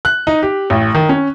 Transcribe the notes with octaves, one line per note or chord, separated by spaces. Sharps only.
F#6
D#4
G4
A1
D#3
C#4